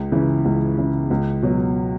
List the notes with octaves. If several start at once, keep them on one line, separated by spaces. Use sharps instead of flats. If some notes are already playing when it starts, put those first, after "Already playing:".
Already playing: C#2
C#3 E3
C#2
C#3 E3
C#2
B2 F#3